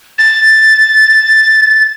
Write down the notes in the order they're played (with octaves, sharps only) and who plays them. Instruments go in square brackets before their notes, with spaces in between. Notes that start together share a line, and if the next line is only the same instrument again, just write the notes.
[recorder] A6